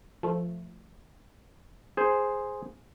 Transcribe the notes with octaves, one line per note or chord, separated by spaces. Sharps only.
F3 A3
G#4 C5